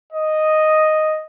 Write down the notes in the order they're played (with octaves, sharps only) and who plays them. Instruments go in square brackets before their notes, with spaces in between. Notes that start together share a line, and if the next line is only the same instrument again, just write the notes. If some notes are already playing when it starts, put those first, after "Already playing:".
[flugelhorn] D#5